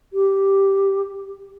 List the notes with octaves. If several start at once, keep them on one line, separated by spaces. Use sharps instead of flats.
G4